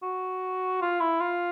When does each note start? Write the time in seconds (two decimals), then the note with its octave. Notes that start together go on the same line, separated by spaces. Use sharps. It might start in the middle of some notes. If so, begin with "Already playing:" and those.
0.03 F#4
0.82 F4
1.00 E4
1.21 F4